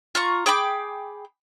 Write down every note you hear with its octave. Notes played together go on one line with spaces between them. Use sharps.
F4 A#5 C#6
G#4 G5 B5 D6